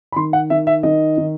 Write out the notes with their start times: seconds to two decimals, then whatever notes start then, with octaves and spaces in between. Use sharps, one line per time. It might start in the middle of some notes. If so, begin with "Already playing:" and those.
0.12 B5
0.16 D#3 C6
0.33 F#5
0.50 D#3 E5
0.67 E5
0.83 D#3 D#5
1.18 D#3